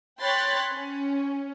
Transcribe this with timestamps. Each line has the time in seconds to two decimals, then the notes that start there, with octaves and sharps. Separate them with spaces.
0.21 C#5 G5 B5 C6 F#6 A6
0.74 C#4